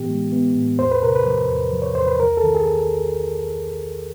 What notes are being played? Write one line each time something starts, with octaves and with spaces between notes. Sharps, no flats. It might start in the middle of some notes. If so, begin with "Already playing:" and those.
Already playing: A2 E3 B3 G4
G#3
B3
A2
E2 C5
B4
C3 A#4
B4
F3
E2
F3
C#5
E2 C5
B4
C2 A#4
A4
D#3
G#4